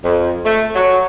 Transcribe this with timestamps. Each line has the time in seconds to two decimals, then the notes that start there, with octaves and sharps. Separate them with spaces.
0.03 F2
0.45 A3
0.76 F#3